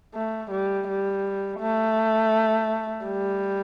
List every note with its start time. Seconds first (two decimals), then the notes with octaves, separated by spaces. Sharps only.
0.15 A3
0.51 G3
0.88 G3
1.60 A3
3.06 G3